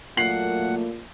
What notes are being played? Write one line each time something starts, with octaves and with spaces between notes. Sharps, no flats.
A#2 F#3 A3 A#3 F#5 C7 F#7